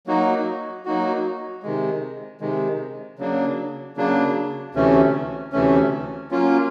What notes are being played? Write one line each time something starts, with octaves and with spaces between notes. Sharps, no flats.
F#3 A#3 D#4 F#4
F#3 A#3 D#4 F#4
C3 D#3 G#3
C3 D#3 G#3
C#3 F#3 A#3 D4
C#3 F#3 A#3 D4
D2 C3 E3 A3 C#4
D2 C3 E3 A3 C#4
F#3 A#3 C#4 F4